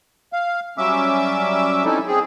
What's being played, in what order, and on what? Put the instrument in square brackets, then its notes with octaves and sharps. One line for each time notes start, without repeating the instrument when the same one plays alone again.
[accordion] F5
F#3 G3 C#4 E5 D6 E6
C4 C#4 D#4 E4 A4
C4 G#4